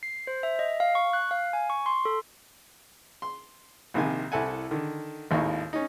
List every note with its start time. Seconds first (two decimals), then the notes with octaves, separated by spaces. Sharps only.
0.03 C7
0.27 C5
0.43 E5
0.59 D#5
0.80 F5
0.95 C#6
1.13 F#6
1.31 F5
1.53 G#5
1.70 C#6
1.86 C6
2.05 A4
3.22 C6
3.94 A#1 C3 D#3 G#5
4.32 C2 E4 A4 F#5 G#5
4.71 D3 D#3
5.31 G#1 D#2 A2 D#4 F4 C#6
5.73 C#4 D#4